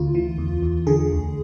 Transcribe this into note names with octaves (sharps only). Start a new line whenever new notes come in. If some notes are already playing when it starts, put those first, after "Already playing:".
Already playing: D2 F4
E3
E2
E2
D3 G#4
D2